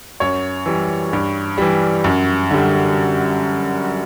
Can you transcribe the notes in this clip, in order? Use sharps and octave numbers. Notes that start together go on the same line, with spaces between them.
F#2 C#5
E3 G3
G2
E3 G3
F#2
D3 G3